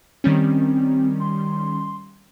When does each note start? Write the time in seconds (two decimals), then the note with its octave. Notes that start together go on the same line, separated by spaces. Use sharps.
0.24 D#3 G3 C4 C#4
1.20 C6